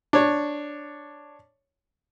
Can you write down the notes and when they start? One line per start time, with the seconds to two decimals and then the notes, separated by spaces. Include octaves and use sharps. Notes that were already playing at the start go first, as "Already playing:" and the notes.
0.13 D4 C#5